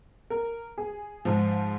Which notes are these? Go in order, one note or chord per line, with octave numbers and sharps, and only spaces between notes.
A#4
G#4
G#2 F3